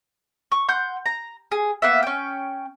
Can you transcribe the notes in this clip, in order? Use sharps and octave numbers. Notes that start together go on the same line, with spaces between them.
C#6
F#5 C6 G6
A#5
G#4
A#3 B3 E5
C#4 G5